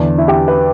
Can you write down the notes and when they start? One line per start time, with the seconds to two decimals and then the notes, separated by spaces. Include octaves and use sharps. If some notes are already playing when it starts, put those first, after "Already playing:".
Already playing: E2 D3 D4
0.18 E4
0.28 G4
0.48 B4